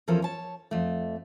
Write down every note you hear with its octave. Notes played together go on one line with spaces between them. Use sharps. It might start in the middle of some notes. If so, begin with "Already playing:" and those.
E2 F3 C#4 A4 A#4
C#5 A5
F2 A3